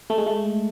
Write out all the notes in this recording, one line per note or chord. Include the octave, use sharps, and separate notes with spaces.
A3
G#3
A3